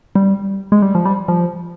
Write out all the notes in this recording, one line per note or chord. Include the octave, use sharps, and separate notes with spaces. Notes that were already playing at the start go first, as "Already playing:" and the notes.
G3
G#3
G3
F3
G3
F3